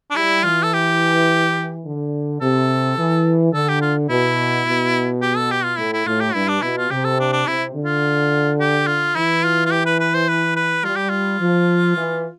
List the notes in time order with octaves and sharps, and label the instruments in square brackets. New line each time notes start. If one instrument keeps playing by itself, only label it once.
[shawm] D4
[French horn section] G3 [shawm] E4
[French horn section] E3 [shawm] F4
[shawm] A4
G4
[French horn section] D3
[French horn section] C3 [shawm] A4
[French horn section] E3
[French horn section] D3 [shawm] A4
[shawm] G4
F4
[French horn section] B2 [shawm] E4
[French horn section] B2
[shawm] G4
A4
G4
F4
[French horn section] A2 [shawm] E4
[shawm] E4
[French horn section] A2 [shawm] F4
[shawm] G4
[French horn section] G2 [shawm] E4
[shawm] D4
[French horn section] B2 [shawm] E4
[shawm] F4
[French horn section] C3 [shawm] G4
[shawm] A4
D4
D4
[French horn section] C3 [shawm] E4
[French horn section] D3
[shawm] F4
G4
F4
[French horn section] E3 [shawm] E4
[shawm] F4
F4
G4
B4
B4
C5
B4
B4
[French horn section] G3 [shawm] F4
[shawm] G4
F4
[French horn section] F3
E3